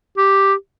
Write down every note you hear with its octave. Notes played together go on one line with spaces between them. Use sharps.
G4